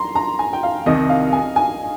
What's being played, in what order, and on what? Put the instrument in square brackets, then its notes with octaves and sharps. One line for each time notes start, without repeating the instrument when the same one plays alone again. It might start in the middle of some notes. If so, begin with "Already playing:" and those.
Already playing: [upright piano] A#5 C6
A#5
G#5
G5
F5
[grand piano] C2 C3 D#3 [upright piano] D#5
[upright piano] F5
G#5
G#5